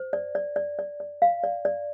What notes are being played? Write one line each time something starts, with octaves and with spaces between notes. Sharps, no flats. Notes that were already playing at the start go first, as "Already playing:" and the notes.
Already playing: C5
D5
D5
D5
D5
D5
F5
D5
D5